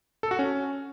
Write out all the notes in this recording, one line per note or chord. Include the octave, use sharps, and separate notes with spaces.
A4
F#4
C#4